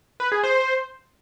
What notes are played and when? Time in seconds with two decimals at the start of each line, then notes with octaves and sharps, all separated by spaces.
0.20 B4
0.32 G#4
0.44 C5